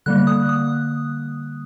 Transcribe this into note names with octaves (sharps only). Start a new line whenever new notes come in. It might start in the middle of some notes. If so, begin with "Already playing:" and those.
D3 G3 A#3 F#6
D#6
D#6